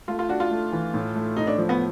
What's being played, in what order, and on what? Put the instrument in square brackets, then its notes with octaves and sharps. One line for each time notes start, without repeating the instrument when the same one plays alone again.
[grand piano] A3 [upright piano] F4
[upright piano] F4
[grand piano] D4 [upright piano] F#4
[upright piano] F4
[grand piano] A3
E3
A2
A3
[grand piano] A2 [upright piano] D#4
[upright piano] D4
[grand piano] F3
[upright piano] B3